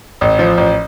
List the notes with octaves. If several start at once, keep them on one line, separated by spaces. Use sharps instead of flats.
A1
F3
A1